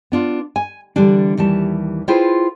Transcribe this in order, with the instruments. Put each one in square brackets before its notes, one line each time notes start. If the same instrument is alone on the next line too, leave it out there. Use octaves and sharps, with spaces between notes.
[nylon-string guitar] B3 D4 F4
G#5
D3 E3 G3 D4
D#2 E3 G3 A5
E4 F4 G#4 B4 C5 G5